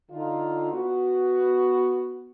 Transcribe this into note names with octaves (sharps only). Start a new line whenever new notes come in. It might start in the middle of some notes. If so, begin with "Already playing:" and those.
D3 D#4 F4
B3 F#4